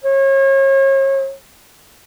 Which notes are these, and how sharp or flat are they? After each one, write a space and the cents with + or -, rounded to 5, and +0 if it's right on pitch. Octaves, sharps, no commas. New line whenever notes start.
C#5 -35